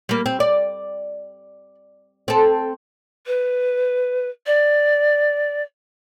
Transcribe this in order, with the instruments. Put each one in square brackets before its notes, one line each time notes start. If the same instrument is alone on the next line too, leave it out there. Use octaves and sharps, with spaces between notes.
[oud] G3 A#3
C4
D5
C4 A4
[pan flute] B4
D5